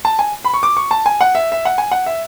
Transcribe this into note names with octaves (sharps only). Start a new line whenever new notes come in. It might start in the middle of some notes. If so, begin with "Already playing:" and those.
A5
G#5
B5
C#6
D6
C#6
A5
G#5
F#5
E5
E5
F#5
G#5
F#5
E5